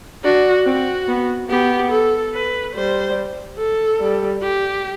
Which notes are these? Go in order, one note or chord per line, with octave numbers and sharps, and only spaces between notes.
D4 F#4
C4 F#4
B3
B3 G4
A4
B4
G3 C5
A4
G3
G4